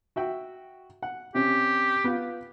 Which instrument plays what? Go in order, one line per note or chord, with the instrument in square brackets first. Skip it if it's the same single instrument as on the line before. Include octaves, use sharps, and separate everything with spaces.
[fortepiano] F#4 E5 G5
F#5
[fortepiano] C3 C#4 [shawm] G4
[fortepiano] B3 F4